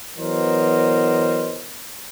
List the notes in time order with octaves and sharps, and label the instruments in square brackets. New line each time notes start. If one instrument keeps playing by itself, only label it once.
[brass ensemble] E3 F#3 B3 A#4 C5 D#5